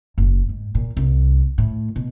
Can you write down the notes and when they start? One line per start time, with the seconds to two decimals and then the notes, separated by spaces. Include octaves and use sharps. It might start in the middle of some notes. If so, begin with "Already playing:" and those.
0.18 F#1
0.49 G#2
0.75 A#2
0.97 C2
1.58 A2
1.96 B2